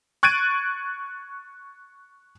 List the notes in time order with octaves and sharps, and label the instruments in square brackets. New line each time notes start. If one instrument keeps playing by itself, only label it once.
[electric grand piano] C#6 F#6 G#6 A6 D7 D#7